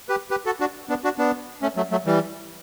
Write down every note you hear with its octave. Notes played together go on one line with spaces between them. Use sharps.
G4 B4
G4 B4
F#4 A4
D4 F#4
B3 D4
D4 F#4
B3 D4
A3 C#4
F#3 A3
F#3 A3
E3 G3